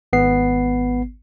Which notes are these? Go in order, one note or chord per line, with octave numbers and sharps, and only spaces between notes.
G#1 B3 C7